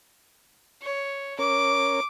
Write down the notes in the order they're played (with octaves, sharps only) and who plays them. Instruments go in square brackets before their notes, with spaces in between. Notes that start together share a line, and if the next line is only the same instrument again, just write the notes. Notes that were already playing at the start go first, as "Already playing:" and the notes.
[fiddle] C#5
[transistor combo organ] C#4 A#4 C#5 [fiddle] D6